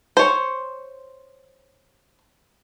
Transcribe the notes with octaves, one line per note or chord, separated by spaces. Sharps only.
C5 C#5